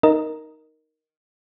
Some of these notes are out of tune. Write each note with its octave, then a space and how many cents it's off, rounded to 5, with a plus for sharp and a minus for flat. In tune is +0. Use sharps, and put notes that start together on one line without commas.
D#4 +0 A#4 +0 D#5 +0